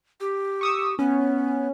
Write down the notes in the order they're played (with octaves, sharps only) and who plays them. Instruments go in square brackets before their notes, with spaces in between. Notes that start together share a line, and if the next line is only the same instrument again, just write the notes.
[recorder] G4
[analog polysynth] C#6 D#6 E6
[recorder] B3 [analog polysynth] C#4